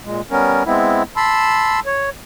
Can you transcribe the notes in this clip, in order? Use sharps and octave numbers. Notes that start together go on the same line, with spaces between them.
A#2 G#3
G3 B3 C#4 A#4
G#3 B3 C4 E4
A5 B5 C6 E6
C#5